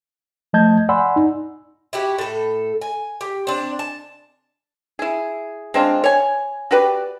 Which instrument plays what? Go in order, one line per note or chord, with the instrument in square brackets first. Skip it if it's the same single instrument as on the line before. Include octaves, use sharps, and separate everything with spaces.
[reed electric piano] F3 A3 D#5 A5 G6 G#6
D5 F#5 G#5 B5 C6 E6
D#4
[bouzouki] E4 F#4 G4
A2 A4
G#5
G4
C4 D4
A5
[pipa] E4 G#4
G#3 C4 D4 F4
C#5 G#5
F#4 G4 B4 D5